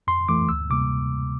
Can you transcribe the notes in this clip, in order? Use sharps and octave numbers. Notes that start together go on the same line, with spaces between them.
F2 C6
E3 A3 D6
D2 E6
C3 G3 A#3 D6